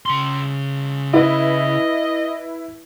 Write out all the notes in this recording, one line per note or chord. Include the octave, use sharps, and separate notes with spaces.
C#3 C6
E4 B4 D#5